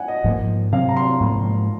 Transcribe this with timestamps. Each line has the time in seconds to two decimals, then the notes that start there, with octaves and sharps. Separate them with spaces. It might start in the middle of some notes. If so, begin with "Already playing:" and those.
Already playing: F#5 G#5
0.08 D#5
0.24 G#2 F3 A#3
0.72 C3 F#3 C4 F5
0.89 A#5
0.97 C6
1.20 G#2 F3 A#3